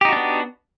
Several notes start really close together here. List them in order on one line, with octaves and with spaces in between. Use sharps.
G4 D#4 F#4 D4 B3